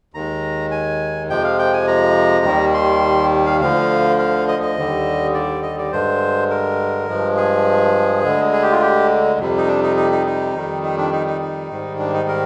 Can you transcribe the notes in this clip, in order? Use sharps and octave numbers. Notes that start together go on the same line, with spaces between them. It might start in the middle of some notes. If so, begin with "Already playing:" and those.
D#2 D#3 G#3 A#5
G#5
F2 C3 F3 G#3 G5
F5
G5
G#5
A#5
D#2 D#3 G3
C6
F5
D2 D3 F3 F5
F5
D#5
D#5
D#2 D3 G3
D5
D#5
D5
G2 D3 G#3 C5
A#4
G2 F3 G#3
G#4
D2 D3 G#3
G#4
G4
F4
G4
F2 C3 G3
D#4
D4
D#4
D#4
D#4
D#4
F2 D#3 G3
D#4
D4
D#4
D#4
D#4
G#2 D#3 G3
D4
D#4
A#4